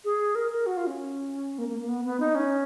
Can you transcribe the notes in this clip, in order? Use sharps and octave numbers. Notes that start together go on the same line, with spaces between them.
G#4
A#4
A#4
F#4
F4
C#4
A#3
A#3
A#3
B3
B3
D#4
C#4